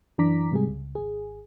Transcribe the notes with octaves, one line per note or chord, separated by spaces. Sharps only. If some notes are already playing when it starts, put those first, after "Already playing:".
F#2 E3 D4 A#5 D6 B6
G#2 C3 G3 G#3 G#4
C#2
G#1 G#4